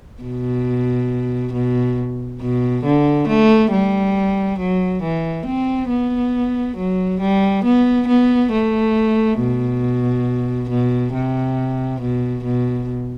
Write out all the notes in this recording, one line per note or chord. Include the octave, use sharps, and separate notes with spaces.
B2
B2
B2
D3
A3
G3
F#3
E3
C4
B3
F#3
G3
B3
B3
A3
B2
B2
C3
B2
B2